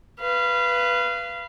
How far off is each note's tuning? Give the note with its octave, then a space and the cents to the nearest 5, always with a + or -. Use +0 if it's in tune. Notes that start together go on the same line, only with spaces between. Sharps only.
B4 +0 F5 -25